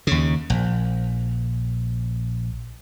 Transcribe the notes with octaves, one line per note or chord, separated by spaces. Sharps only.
D#2 C#3
A#1